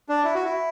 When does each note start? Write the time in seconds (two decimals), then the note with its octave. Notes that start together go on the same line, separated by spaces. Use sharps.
0.09 D4
0.25 E4
0.34 F#4
0.44 E4